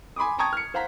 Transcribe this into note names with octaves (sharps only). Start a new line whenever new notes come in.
G#5 B5 C6 D6 D#6
G5 A5 A#5 C#6 D#6 G#6
F6 C#7
C5 F5 F#5 A#5 B6